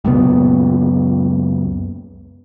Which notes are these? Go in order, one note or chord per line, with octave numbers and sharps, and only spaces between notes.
C#2 F#2 A#2 B3